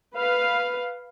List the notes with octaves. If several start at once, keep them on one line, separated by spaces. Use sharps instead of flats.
B4 F5